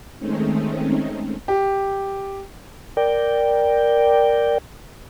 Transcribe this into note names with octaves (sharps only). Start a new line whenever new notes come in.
D#3 G#3 A3 C4 C#4 D#4
G4
A#4 D5 G5